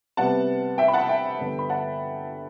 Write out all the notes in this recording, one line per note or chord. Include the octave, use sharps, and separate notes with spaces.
C3 G3 B3 F#5 A5
E5 G5
B5
F#5 A5
E5 G5
G2 D3 G3 B3
B5
F#5 A5